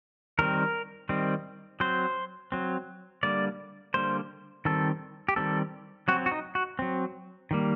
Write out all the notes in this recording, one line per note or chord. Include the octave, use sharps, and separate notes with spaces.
D#3 G3 C4 A#4
D#3 G3 C4
F#3 C4 C5
F#3 C4
D3 G3 A#3 D5
D3 G3 A#3 C5
D#3 G3 C4 A4
G4
D#3 G3 C4 A4
F#3 C4 F#4
F#4
D#4
F#4
F#3 C4
D#3 G3 A#3